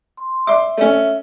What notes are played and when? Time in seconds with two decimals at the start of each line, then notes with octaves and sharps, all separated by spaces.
0.17 C6
0.47 E5 C6 D6
0.77 A3 C#4